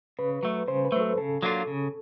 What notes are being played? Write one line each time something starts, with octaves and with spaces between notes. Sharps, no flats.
C#3 B4
F#3 A3
C#3 C5
B4
F#3 A3
A4
C#3 A4
F#3 A#3 D4 F4
C#3